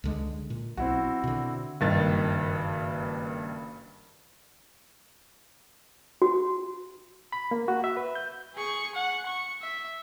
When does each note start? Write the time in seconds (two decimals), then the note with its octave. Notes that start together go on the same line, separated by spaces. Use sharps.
0.04 C#2 D3 G#3
0.50 A#2
0.77 B1 C4 E4 F#4
1.24 B2 D3
1.81 F#1 G2 D#3 A6
6.22 F#4
7.32 B5
7.51 A#3
7.68 F#4
7.84 E5
7.97 B4
8.15 G6
8.55 G#4 C#6
8.95 F#5
9.27 C#6
9.61 E5